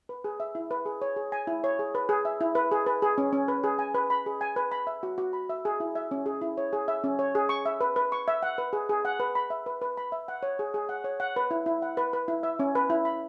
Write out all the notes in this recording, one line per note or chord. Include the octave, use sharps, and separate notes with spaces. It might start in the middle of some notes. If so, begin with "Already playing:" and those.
B4
G#4
E5
E4
B4
G#4
C#5
G#4
G#5
E4
C#5
G#4
B4
G#4
E5
E4
B4
G#4
B4
G#4
C#4
C#4
B4
G#4
G#5
B4
B5
G#4
G#5
B4
B5
E5
F#4
F#4
B5
E5
G#4
E4
E5
C#4
G#4
E4
C#5
G#4
E5
C#4
C#5
G#4
C#6
E5
B4
B4
C#6
E5
F#5
B4
G#4
G#4
F#5
B4
B5
E5
B4
B4
B5
E5
F#5
C#5
G#4
G#4
F#5
C#5
F#5
B4
E4
E4
F#5
B4
B4
E4
E5
C#4
B4
E4
B5